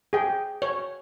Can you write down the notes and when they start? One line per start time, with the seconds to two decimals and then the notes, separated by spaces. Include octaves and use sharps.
0.13 G#4 G5
0.62 C#5